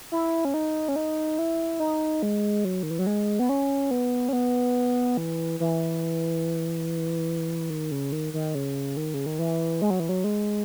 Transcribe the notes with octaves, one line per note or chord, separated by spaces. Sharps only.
E4
C#4
D#4
C#4
D#4
E4
D#4
G#3
F#3
D#3
E3
F#3
G#3
B3
C#4
B3
C#4
B3
E3
E3
D#3
C#3
D#3
D#3
C#3
D#3
C#3
D#3
E3
G#3
F#3
E3
F#3
G#3